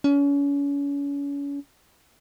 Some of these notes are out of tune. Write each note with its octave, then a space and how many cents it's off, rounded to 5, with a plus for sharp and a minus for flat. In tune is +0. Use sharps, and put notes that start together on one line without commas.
C#4 +35